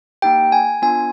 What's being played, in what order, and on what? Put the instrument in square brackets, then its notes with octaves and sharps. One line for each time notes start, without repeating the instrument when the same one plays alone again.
[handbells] A#3 D#4 G4 G5
G#5
B3 D4 F4 G#5